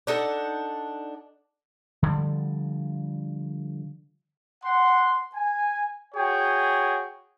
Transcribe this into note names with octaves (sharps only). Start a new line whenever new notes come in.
D4 D#4 A4 F#5
D3 F3 G3
F#5 C6
G#5
F#4 G#4 C#5 G5